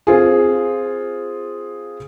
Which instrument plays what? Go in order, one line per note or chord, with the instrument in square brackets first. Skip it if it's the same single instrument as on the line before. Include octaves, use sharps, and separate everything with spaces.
[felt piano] C4 F4 G#4